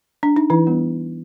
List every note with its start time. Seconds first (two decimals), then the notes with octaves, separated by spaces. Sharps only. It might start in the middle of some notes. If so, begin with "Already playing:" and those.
0.23 D4
0.36 D#4
0.50 E3 E4
0.67 G3 B3 D4